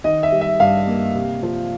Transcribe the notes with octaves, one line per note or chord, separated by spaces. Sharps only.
D#3 D#5
E5
G3
E5
G2 F5
A#3
C3
F3